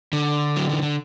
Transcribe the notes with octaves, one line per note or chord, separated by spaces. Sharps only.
D3
F#3
E3
D3